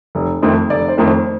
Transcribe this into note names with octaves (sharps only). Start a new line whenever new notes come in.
F1
F2 D#3 A3 C4
F1 D5
C5
F2 D#3 A3 C4
C5